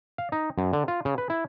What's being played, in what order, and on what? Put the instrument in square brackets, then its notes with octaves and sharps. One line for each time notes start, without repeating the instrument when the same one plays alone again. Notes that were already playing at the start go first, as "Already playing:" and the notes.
[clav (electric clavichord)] F5
D#4
F#2
D3
F4
C#3
B4
E4